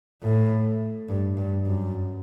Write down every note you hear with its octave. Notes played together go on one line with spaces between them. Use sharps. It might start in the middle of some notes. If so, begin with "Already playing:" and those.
A2
G2
G2
F#2